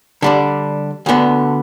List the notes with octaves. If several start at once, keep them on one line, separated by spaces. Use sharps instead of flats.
D3 G3 D4
D2 D3 B3